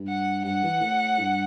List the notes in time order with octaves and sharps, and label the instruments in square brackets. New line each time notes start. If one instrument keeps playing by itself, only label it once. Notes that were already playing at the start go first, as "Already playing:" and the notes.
Already playing: [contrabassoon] G2
[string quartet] F#5
[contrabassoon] G2 [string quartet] F#5
[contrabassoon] E3
A2
G2